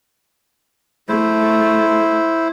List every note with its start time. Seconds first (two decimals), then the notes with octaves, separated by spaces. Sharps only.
1.09 A3 E4 C5